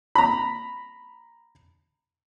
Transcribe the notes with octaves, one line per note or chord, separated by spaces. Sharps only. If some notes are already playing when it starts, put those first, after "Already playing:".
A#5 B5